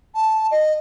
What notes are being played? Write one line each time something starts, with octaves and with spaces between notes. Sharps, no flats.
A5
D#5